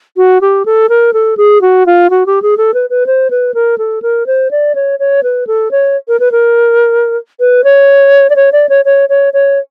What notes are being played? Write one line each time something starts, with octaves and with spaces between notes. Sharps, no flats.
F#4
G4
A4
A#4
A4
G#4
F#4
F4
F#4
G4
G#4
A4
B4
B4
C5
B4
A#4
A4
A#4
C5
D5
C#5
C#5
B4
A4
C#5
A#4
B4
A#4
B4
C#5
D5
C#5
D5
C#5
C#5
C#5
C#5